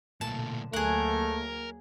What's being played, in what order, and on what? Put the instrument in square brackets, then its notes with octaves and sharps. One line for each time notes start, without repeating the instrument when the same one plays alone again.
[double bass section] B1 D3 [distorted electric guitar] A#2 A3 [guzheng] A5
[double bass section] D2 F#3 A#3 [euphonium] A3 [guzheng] G#4 F#5 [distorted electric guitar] A#4